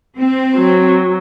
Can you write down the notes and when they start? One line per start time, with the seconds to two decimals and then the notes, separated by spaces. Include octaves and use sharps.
0.18 C4
0.56 F#3